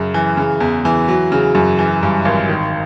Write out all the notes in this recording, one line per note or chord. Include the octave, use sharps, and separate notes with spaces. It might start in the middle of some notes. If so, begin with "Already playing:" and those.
Already playing: F#2 C#3
E3
C#3
E2
E3
F#3
C#3
F#2
E3
G2
G#1
D#3